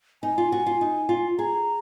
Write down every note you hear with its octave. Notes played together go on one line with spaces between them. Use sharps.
D#4 G#5
F4
F#4
F4
D#4
F4
G#4 A#5